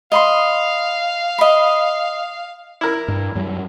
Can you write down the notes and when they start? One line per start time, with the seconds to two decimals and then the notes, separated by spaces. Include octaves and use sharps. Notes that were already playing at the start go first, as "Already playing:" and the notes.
0.12 D#5 F5 B5 C6
1.38 D#5 B5
2.81 E4 A#4
3.08 G2
3.35 F#2 F#3 G3